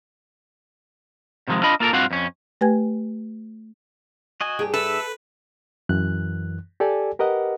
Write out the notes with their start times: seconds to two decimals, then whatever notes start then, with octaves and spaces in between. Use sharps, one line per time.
1.48 C3 D#3 F3 F#3 G#3
1.63 D4 F4 D#5 B5
1.80 A#3 F4 A4 A#4
1.93 G2 C4 F4 F#4 F5 F#5
2.11 F2 C#4
2.61 A3 G4 B4 G5 G#5 G#6
4.41 F#4 D#5 G#5
4.59 G2 G4 G#4
4.74 A4 B4 E5
5.89 F#2 E3 F#6
6.80 G4 A4 D5 G#5
7.19 G4 A#4 B4 D#5 F#5